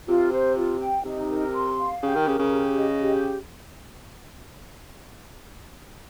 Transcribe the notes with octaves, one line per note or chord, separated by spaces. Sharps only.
C3 F4
C5
F4
G5
C3 D#4
A#4
C6
F5
C#3 G4
D#3
C#3 A#4
C#3
G4
D#5
G4